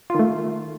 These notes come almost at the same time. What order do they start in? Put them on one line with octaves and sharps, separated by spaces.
F4 D#3 A3